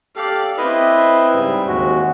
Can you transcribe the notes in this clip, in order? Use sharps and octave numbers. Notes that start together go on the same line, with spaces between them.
G4 A4 D5 F5
C4 E4 B4 D#5 E5
G#2 C#3 G3
D#2 G#3 F#4